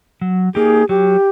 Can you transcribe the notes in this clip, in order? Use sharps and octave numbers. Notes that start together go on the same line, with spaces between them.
F#3
A#3 D#4 G4 G#4
F#3 G4